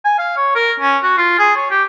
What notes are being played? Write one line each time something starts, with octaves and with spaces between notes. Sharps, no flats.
G#5
F5
C#5
A#4
C#4
F#4
F4
G#4
C#5
G4